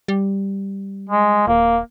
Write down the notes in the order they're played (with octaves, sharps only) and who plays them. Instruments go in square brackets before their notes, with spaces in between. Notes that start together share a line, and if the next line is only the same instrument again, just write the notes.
[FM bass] G3
[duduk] G#3
[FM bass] D#1 [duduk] A#3